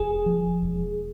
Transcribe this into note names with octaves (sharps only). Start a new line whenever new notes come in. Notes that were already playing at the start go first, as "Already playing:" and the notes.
Already playing: E1 G#4
F3
E1